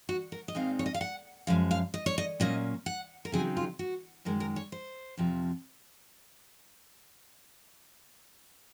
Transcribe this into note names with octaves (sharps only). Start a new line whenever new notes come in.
F#4
A#4
D#5
A#2 G#3 C4 D#4 F5
C#5
D#5
F5
F#5
F#2 F3 G#3 F5
F5
D#5
C#5
D#5
A#2 F#3 A#3 C#4 D#5
F#5
A#4
C#3 F#3 C4 D#4 G#4
F4
F#4
F#2 D#3 G#3 A#4
A#4
C#5
C5
F2 C3 F3